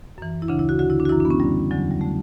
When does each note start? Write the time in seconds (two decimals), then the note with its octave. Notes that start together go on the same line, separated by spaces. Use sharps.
0.18 F#2 E3
0.42 E4
0.48 D2 C#3 E3 D4
0.59 E4
0.69 F#4
0.79 D2 D3 F#4
0.90 E4
1.00 D4
1.05 F#4
1.09 F#2 E3 E4
1.20 D4
1.25 B3
1.30 C#4
1.40 F#2 D3 G3
1.71 E2 D3 F#3
1.91 G3
2.01 D3 A3